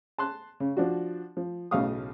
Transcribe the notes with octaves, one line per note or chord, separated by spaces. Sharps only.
A5 C6 F#6
C#3
F3 D4 F#4
F3
B1 A2 C#3 F5 C#6 D#6